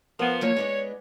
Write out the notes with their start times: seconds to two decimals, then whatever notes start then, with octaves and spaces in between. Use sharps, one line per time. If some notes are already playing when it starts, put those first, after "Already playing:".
0.19 F3 B3 A#4
0.41 F3 F#3 A#3 C#5
0.57 G#3 B3 D4